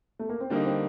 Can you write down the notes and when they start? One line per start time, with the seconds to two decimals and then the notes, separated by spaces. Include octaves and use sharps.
0.19 A3
0.29 A#3
0.40 C4
0.50 D3 G3 A#3 D4 D#4
0.65 C4